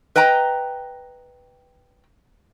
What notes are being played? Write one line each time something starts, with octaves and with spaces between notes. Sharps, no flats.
B4 D#5 G5 A#5